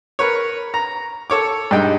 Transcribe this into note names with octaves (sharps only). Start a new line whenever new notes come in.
A#4 B4 C#5
A#5
A4 C#5 D6
G2 G#3 D#4 G5